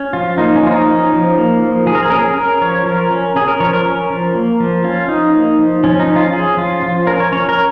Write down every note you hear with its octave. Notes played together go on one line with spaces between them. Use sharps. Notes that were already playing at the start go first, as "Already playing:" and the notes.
Already playing: C#4
F3 F4
A#3 D#4
C#4
F3 F4
D#4
C#4
F3
A#3
F3
F3 G#4
A#4
G#4
C#4 A#4
G#4
C#4 A#4
F3 C#5
F3 A#4
C#4
C#4 G#4
A#4
F3 C#5
A#4
C#4
F3
A#3
F3
C#4 F4
F3 D#4
A#3
F3
F3 C#4
D#4
C#4
F4
C#4 G#4
F3 F4
F3 F4
C#4 A#4
C#5
C#4 C#5
A#4